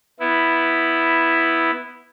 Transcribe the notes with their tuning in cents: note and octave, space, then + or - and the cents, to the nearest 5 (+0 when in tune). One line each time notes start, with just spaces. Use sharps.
B3 +0 E4 +0